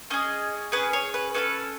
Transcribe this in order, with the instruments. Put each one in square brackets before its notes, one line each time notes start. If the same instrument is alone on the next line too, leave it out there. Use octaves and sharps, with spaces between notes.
[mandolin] C#4 G#4 D#5
C#4 G#4 B4
C#5
B4
C#4 F#4 A4 B4